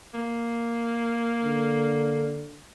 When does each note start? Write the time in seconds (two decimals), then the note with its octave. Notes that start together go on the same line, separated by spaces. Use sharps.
0.14 A#3
1.44 D3